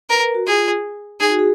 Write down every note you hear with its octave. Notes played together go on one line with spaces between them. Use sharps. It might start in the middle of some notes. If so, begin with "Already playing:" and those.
A#4 B4
A#4
F#4
F4 G#4
D#4 G#4
F#4
G#4